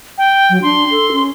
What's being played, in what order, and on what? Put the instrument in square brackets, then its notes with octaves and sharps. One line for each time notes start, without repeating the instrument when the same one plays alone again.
[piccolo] G5
[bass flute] F#3
[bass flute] D4 [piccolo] C6
[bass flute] A4
C#4